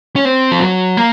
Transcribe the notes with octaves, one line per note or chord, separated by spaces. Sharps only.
C#4
C4
F3
F#3
A#3